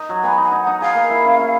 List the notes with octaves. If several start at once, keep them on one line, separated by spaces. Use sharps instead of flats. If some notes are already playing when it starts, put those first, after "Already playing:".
Already playing: D#4
F#3
B3 G#5
D#4 G#5
D#4
F#5
D#4
G#4 F5
A#3
E4
C#4
E4